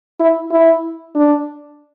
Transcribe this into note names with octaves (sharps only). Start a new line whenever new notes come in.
E4
E4
D4